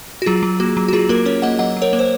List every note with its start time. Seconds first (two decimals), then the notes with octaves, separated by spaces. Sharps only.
0.22 F#4
0.26 F#3 F4 G#4
0.43 F#3
0.60 A#3 F#4
0.77 F#3
0.88 F#4
0.93 F#3 F4 G#4
1.09 A#3 F#4 A#4
1.26 C#4 A#4 C#5
1.42 A#3 D#5 F#5
1.59 F#3 D#5 F#5
1.77 F#3
1.82 A#4 C#5
1.93 A#3
1.99 C5